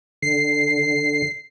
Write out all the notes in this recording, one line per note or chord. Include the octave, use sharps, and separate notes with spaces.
D3 C7